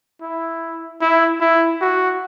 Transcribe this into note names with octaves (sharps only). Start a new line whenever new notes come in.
E4
E4
E4
F#4